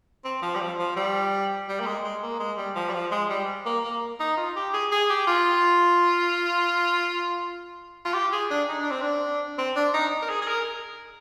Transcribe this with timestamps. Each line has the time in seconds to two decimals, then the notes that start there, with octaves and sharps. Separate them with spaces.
0.25 C4
0.42 F3
0.55 G3
0.60 F3
0.79 F3
0.97 G3
1.69 G3
1.80 A#3
1.86 G#3
2.04 G#3
2.23 A#3
2.40 G#3
2.58 G3
2.76 F3
2.89 G3
2.93 F3
3.11 G#3
3.30 G3
3.66 A#3
3.84 A#3
4.20 D#4
4.37 F4
4.56 G4
4.74 G#4
4.92 G#4
5.10 G4
5.27 F4
8.05 F4
8.14 G4
8.32 G#4
8.51 D4
8.69 D#4
8.80 D4
8.91 C4
9.01 D4
9.58 C4
9.76 D4
9.94 D#4
10.22 A#4
10.30 G#4
10.42 G#4
10.48 A#4